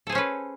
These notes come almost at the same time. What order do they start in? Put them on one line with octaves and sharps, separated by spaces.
A4 G#4 C5 C#4 B4